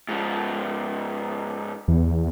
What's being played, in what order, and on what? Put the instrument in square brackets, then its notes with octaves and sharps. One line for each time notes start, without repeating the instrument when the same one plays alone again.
[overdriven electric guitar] G#2 F3
[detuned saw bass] E2